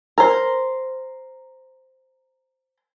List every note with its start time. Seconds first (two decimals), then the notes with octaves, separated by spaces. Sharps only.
0.18 A#4 C5